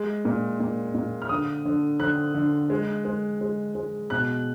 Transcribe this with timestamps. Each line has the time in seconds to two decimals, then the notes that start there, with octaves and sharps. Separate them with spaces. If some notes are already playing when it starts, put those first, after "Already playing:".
Already playing: G#3
0.25 A#2
0.60 A#2
0.95 A#2
1.22 F6
1.29 D3 D#6
1.65 D3
2.00 D3 F#6
2.35 D3
2.70 G#3
3.05 G#3
3.41 G#3
3.75 G#3
4.10 B2 F#6